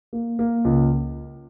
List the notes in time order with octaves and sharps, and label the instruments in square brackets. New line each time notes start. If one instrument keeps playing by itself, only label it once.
[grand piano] A#3
A#3
C#2